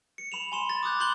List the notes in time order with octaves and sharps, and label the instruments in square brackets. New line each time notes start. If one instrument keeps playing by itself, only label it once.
[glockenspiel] C#7
B5 E7 F7
G#5 C6 E7
A6
D6 D#6 F#6 G6
B5 C6 F#6 G6 F#7 G7